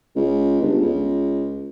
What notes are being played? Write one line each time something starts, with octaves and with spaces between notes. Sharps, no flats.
C#2
G1
C#2